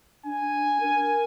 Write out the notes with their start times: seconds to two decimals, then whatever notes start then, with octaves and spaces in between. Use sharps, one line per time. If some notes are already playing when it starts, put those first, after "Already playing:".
0.25 D4 G#5
0.80 A#4